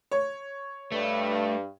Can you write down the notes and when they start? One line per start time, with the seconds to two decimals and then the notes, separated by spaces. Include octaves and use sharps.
0.11 C#5
0.92 G2 A3